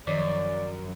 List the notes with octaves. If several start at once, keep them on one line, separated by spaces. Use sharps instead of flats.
F#2 D#3 F3 D5